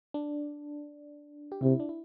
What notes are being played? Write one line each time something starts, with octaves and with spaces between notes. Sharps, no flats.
D4
G4
C3 E4
D4
E4